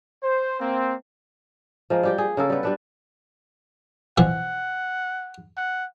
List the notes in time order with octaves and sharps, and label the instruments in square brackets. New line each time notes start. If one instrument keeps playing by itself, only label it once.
[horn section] C5
A#3 C4
[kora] F3 G#3 A#3
G3 G4 G5
G#4
C#3 A#3 A4
G3 B3
G3 D4 B4
[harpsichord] B2 E3 F3 [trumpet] F#5
[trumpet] F#5